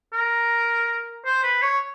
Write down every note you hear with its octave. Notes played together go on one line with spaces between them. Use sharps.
A#4
C5
B4
C#5